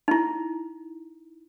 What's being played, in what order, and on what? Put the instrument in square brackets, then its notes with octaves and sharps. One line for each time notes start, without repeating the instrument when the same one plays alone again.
[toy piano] D#4 E4